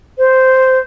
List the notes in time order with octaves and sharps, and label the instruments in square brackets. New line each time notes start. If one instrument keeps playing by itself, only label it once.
[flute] C5